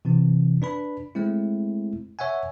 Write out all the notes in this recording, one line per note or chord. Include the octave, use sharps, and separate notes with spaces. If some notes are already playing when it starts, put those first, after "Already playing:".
C3 E3 C4
D4 B4 B5
G#3 A3 C4 E4
C#5 E5 F#5 G#5